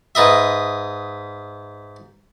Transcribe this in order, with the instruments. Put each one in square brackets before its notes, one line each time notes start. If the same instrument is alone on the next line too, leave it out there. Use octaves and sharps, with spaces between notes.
[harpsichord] G#2 B4 D#5 E5